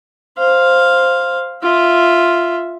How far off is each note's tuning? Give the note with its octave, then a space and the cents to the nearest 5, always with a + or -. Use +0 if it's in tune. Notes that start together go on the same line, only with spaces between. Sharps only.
C5 +5 F5 +0
F4 -5 E5 +0